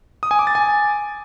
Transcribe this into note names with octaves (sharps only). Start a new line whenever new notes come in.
D#6
G#5
D6
A6
G#5